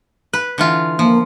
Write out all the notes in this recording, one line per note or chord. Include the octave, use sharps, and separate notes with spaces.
B4
D3 E3 F4
F3 A#3